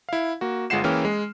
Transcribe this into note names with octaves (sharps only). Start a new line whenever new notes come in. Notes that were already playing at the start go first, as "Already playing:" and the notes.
E4 F5
A#3 F#4
G1 G#3 F4 F#5 C7 E7
E3 A#3 C#4 G#4 G5 F6
G#3